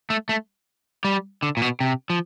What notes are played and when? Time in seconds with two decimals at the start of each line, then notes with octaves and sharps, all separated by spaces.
0.10 A3
0.29 A3
1.05 G3
1.43 D3
1.57 A#2
1.62 B2
1.81 C3
2.10 F3